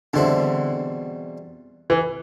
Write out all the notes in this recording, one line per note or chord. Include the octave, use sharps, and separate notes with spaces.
E2 B2 D3 G3 C4 E4
E3